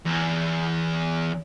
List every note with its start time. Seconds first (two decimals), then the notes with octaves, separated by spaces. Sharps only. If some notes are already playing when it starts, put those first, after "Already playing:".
0.06 E2